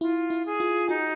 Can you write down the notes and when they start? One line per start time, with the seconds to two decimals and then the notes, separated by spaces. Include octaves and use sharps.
0.01 E4 F4
0.30 E4
0.46 G#4
0.60 F4
0.89 D#4 F#4